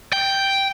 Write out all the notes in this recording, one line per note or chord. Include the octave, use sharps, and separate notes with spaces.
G5